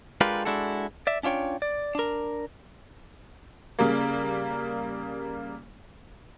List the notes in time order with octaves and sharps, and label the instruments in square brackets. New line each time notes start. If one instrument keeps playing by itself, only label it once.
[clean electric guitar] G#3 D4 F4 G4 A#4 B4
G#3 D4 E4 F#4 A4
D5 E5
C#4 D4 F4 C#5 G5
D5
D4 A#4
[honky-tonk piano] C#3 G3 A#3